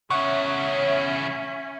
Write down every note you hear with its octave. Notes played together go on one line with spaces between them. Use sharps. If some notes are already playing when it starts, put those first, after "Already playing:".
E2 C#3 C#4 C#5 E5 F#5